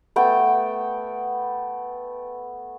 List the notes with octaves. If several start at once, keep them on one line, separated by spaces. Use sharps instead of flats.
A3 B3 G5